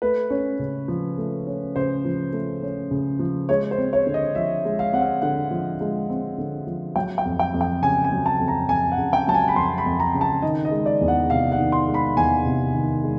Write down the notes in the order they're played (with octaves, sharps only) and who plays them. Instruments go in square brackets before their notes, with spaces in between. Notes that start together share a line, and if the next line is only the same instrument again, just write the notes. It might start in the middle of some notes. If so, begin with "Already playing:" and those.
[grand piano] A3 B4
C#4
C#3
F3
A3
C#4
C#3 C5
F3
A3
C#4
C#3
F3
G#3 C#5
C5
C4
C#5
D3
D#5
F3 E5
G#3
F5
C4 F#5
F5
D3 F#5
F3
G#3
C4
D3
F3
F#3 G5
G5
F2
G5
F2
G5
C#3 G#5
G#5
F#3
A5
F2
A#5
F2 G#5
F#5
C#3
G5
F#3 A5
G#5
B5
F2 C6
B5
F2
A#5
C#3
A5
D#3 D#5
D#5
G#3
D5
E2
F#5
C3 F5
F#5
D#3
C6
G#3
B5
E2 G#5
C3
D#3
G#3